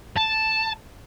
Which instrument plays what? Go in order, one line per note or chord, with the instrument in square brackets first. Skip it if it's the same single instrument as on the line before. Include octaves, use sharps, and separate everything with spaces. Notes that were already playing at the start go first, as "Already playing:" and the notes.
[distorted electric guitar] A5